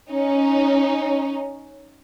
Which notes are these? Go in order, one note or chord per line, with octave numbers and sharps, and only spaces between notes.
C#4 D#4